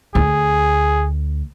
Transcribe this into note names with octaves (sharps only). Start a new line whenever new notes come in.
D2 G#4